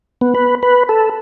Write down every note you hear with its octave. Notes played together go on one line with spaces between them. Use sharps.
B3
B4
B4
A4